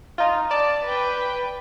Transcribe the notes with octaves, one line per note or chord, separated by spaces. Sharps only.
D#4 F4
D5 A5
B4 G5